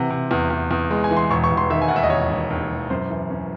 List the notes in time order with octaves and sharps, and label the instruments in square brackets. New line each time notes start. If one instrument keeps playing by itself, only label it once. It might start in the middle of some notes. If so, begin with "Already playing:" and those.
Already playing: [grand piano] C3 E3 F#5
C3
E2
E2
E2
G#3
G#5
E3
C6
E1 C#6
C#6
E1
C6
D#3 E5
G#5
D#2 F#5
E5
D#5
E1 C#5
E1
D#2
E1
F#2 C5
E3
C#4